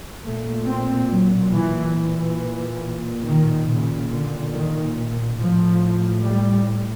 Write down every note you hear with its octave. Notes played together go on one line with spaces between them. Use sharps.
A#2 A3
C4
F#3
E3
A#2 E3
D#3
A#2 C#3
D3
D#3
A2 F3
G3